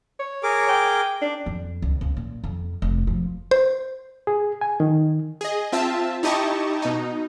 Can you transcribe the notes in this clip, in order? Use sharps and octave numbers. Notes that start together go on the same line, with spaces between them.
C#5
G#4 A#4 D6
G5
D4
F2
C#2
C#2
A#2
F2
F1
F3
C5
G#4
G#5
D#3
G#4 D#5
C4 F4 E5 A5
D#4 E4 G4 D#5 A5 C#6
B2 D#4